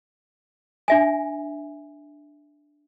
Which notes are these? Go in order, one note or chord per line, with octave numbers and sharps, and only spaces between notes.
D4 E5 G#5